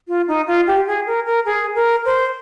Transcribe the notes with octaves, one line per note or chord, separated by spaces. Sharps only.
F4
D#4
F4
G4
G#4
A#4
A#4
G#4
A#4
C5